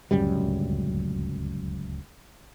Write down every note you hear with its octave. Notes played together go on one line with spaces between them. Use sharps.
D1 C#2 F#2 G3